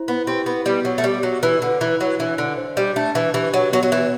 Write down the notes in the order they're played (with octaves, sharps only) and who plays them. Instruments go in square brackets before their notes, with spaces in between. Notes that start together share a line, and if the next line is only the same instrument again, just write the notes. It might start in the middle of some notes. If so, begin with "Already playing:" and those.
Already playing: [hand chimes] E4 C5
[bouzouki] B3
[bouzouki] C4 [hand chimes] G4
[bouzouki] B3
[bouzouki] G3 [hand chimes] B3
[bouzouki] F#3
A3
[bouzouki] G3 [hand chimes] G4
[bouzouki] F#3
[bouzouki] E3 [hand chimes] B4
[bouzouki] D3
[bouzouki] E3 [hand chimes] E4
[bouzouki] F#3
[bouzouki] E3 [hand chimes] D4
[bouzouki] D3
[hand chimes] C5
[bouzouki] G3
[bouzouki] A3 [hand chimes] D4
[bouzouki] E3
[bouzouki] E3 [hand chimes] G4
[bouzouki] F#3
[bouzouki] F#3 [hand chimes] B3
[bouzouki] F#3
E3